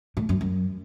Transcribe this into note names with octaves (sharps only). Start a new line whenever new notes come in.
A2
F#2
F#2